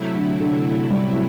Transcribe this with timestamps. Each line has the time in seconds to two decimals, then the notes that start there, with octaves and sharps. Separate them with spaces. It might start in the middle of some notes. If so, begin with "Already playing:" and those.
Already playing: C3 F#3 A3 E4
0.15 D3
0.40 D3
0.90 G3